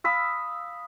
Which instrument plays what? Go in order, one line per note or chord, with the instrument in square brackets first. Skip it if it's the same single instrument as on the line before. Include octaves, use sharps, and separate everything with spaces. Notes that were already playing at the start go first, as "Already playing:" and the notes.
[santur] F5 B5 D#6 E6